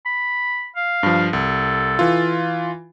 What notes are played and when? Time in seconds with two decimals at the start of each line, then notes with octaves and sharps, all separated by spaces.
0.06 B5
0.76 F5
1.03 G2 F3
1.33 C2 A4
1.99 E3 F4